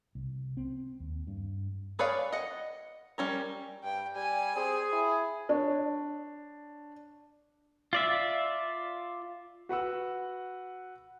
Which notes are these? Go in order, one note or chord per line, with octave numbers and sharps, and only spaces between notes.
C2
C4
D#2
G2
G#4 B4 C#5 D5 F5
D#5 F#5
G3 C#4 A#4
G2 G5
G3 G#5
C4 G#4
E4
D4 C#5
F4 D5 E5
F#4 B4 F#5 E6